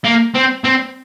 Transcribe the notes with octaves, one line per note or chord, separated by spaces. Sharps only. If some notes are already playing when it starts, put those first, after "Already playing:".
A#3
C4
C4